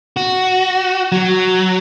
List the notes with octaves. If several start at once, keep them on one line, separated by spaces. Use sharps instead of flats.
F#4
F#3